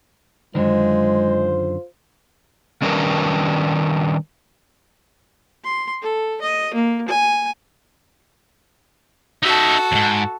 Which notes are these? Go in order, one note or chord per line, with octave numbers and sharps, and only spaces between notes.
F#2 D3 D#3 G#3 F4 C5
D#3 G3 C#4 D4 A#4 B4
C6
A4
D#5
A#3
G#5
D#4 F#4 A4 E5
E2 G#2